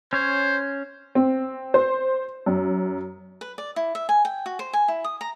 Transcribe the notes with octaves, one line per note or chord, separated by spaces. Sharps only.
C#4 C5 C#5
C4
C5
F#2
B4
D5
E4
E5
G#5
G5
F#4
C5
G#5
E4
D#6
A#5